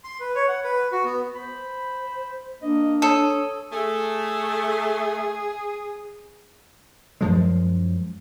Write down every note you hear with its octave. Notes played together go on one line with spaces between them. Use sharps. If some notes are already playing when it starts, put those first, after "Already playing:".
C6
B4
C#5
F#5
B4
F#4
B3
C5 B5
A#3 D4 D#5
A4 C#5 D#6
A3 G#4
F#2 F3 G#3